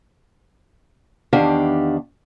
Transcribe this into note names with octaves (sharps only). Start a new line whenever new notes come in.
E2 D#3 D4 G4 F5 F#5